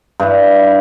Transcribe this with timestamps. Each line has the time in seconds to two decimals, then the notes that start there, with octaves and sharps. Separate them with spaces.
0.20 G2 E4